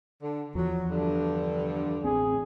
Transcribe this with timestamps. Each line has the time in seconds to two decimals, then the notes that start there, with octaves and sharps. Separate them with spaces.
0.22 D3
0.55 E2 F3 F#3
0.89 G2 D3
2.04 A1 C4 G#4